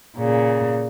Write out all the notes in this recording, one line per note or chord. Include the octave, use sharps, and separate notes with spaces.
A#2 C#3